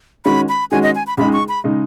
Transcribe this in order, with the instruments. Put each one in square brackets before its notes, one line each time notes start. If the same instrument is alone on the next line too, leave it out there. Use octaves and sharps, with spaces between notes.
[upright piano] D#3 G#3 C#4 F#4 [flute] B5
[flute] B5
[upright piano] D#3 G#3 C#4 F#4 [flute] G#5
[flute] D#5
G#5
B5
[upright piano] C#2 C#3 G#3 D#4 [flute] B5
[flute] C#6
B5
[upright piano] C#3 G#3 D#4